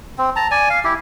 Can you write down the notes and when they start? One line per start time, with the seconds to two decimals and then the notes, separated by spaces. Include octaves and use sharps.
0.18 C4
0.36 A5 A#5
0.51 D5 G#5
0.70 F5
0.84 E4 G4